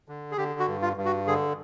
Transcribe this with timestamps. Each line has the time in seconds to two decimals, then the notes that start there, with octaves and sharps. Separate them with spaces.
0.08 D3
0.32 G#4
0.38 D3 G4
0.60 F#4
0.67 G2
0.82 F4
0.97 G2
1.05 F#4
1.27 D3 G#4